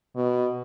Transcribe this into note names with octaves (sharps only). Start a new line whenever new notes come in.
B2